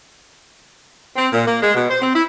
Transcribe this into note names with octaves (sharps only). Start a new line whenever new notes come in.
C4
A#2
A#3
G#3
B2
C5
C4
E4